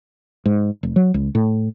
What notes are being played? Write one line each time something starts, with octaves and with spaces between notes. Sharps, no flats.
G#2
F1
F#3
C#2
A2